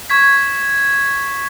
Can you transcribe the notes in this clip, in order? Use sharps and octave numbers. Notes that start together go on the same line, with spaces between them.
C#6 G#6 B6